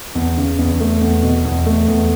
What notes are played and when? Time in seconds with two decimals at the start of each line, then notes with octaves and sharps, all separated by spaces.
0.15 E2
0.37 C#3
0.58 E2
0.80 A3
1.01 E2
1.23 B2
1.45 E2
1.66 A3
1.88 E2